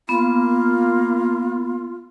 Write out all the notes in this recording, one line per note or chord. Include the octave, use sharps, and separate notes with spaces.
A#3 B3 F4